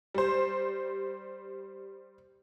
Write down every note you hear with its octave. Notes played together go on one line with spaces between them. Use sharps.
G3 C5